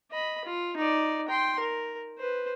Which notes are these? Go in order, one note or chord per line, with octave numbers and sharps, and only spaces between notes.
D#5 B5
F4
D#4 D5
G5 C6
A#4
B4 C5